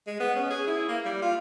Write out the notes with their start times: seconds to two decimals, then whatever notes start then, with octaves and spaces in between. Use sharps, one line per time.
0.07 G#3
0.20 B3
0.36 C#4
0.50 G#4
0.67 E4
0.89 A#3
1.06 G3
1.22 F4